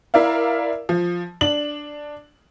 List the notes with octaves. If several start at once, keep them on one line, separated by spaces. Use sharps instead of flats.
E4 A#4 D5 E5 F5
F3
D4 F#7